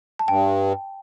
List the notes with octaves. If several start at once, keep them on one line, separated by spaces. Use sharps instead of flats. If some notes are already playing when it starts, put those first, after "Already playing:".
A5
G2 G5